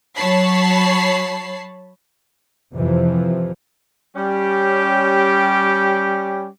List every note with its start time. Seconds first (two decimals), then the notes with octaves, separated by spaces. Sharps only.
0.15 F#3 C#5 A5 B5 C7
2.75 F2 C3 E3 F3
4.16 G3 C#4 G4